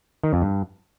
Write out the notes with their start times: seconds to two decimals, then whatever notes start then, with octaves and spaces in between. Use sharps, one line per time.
0.24 D#3
0.33 F2
0.42 G2